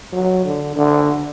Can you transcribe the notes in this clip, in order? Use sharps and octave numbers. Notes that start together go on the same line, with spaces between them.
F#3
D3
D3